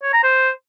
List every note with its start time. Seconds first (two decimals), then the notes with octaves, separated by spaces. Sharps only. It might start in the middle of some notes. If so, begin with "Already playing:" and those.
0.03 C#5
0.13 A#5
0.24 C5